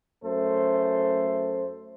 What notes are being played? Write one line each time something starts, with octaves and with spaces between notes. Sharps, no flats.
F#2 A3 A4 C5